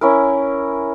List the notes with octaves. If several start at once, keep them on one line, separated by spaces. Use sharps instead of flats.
C#4 E4 A#4